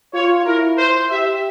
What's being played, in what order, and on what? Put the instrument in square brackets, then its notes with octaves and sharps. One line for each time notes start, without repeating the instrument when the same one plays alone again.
[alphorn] F4 [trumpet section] C#5
[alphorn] E4 [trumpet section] A#4
[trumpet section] C5
[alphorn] G4 [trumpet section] E5